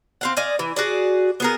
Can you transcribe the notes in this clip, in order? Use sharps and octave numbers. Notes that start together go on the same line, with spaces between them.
C4 F5 F#5
D5 D#5 F5 G#5
E3
F#4 G#4 D5
B3 G#4 A#4